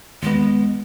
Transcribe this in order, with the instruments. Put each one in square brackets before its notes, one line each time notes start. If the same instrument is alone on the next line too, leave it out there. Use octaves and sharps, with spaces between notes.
[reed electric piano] D#2 B3 [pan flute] G#3